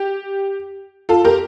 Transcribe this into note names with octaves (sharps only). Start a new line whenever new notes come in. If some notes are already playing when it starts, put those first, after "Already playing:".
Already playing: G4
F4 A4
G4 A#4